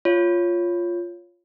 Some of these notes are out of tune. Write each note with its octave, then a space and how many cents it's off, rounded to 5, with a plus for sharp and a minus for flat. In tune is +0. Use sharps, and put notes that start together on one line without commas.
F4 +0 C#5 +0